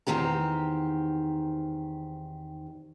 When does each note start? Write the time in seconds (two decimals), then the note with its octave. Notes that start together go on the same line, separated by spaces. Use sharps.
0.07 E2 D#3 C4 G4 A#5